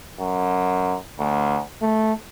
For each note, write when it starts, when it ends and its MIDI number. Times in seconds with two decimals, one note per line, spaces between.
0.20 0.95 42
1.19 1.59 38
1.82 2.13 57